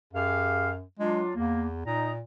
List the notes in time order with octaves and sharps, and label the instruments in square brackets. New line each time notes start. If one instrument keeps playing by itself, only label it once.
[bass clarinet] F#2 [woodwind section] G4 G#4 F5
[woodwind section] F#3 D4 F4 [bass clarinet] G#3
[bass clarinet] E2 [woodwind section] A#3
[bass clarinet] A#2 [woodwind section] D#4 A#5